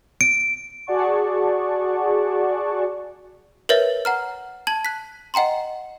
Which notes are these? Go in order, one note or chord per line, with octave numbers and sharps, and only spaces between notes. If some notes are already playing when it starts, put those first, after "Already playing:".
D7
F#4 G#4 D5 F#5 A5 C#6
A#4 B4 C#5 E5 A6
F#5 A#5 F6
A5 G#6 F#7
F#6 B6
D#5 F#5 G5 A#5 C6